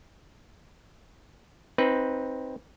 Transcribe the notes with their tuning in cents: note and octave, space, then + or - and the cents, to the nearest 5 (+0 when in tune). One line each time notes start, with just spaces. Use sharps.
C4 +10 D#4 +15 B4 +0